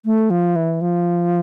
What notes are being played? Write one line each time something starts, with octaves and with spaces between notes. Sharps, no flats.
A3
F3
E3
F3